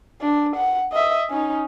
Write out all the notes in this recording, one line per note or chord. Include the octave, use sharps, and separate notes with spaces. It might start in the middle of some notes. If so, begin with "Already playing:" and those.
D4
F#5
D#5 E5
C#4 D#4